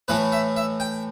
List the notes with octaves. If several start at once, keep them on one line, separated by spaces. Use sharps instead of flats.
A2 E3 A3 B4
E5
E5
G5